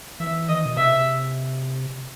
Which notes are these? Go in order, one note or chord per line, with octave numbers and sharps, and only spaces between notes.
E3 E5
D#3 D#5
B2
C3 E5